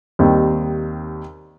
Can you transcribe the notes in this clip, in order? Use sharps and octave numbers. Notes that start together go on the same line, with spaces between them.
D#2 D#3 G3 C4